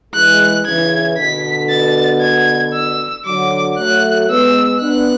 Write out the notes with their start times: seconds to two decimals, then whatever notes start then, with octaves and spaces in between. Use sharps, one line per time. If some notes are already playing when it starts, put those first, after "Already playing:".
0.14 E3 G#3 F#6
0.66 C#3 E3 G#6
1.17 B2 D3 B6
1.70 A6
2.21 G#6
2.74 E6
3.26 D3 F#3 D6
3.78 F#3 A3 F#6
4.29 G#3 B3 E6
4.81 B3 D4 F#6